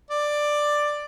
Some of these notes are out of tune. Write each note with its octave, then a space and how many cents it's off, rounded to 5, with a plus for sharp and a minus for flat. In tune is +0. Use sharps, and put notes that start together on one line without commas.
D5 +10